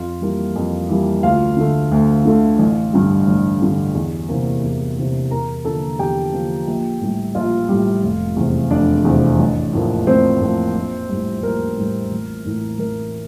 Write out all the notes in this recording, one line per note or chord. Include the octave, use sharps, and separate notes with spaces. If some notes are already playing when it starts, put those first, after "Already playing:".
Already playing: F2 F4 F5
E3 G3 A#3
F2
E3 G3 A#3
D2 F4 F5
D3 A3
D2
D3 A3
A1
G2 D3 G3
A1
G2 D3 G3
E2
C3 E3 A#3
E2
C3 E3 A#3
E2 A#4 A#5
D3 F3 A#3 A4 A5
E2 G4 G5
D3 F3 A#3
A#1
A2 G3
A#1 F4 F5
A2 G3
F1
E2 C3
F1 D4 D5
E2 C3
A1
A2 F3 A#3
A1 C4 C5
A2 F3 A#3
A#1
A2 G3
A#1 A#4
A2 G3
A1
A2 E3
A1 A#4